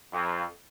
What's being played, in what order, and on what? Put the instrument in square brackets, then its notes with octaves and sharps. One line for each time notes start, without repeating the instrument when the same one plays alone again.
[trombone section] F2